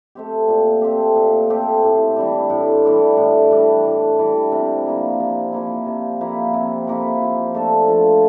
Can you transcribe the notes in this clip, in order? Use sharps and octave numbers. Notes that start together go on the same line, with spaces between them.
A3 C4 G4
A#2
A3 C4 G4
A#2
A3 C4 G4
A2
E3 G3 D4
A2
E3 G3 D4
A2
E3 G3 D4
A2
E3 G3 D4
C3
F3 A#3 E4
C3
F3 A#3 E4
C3
F3 A#3 E4
C3
F3 A#3 E4
F3
A3 D4 A4
F3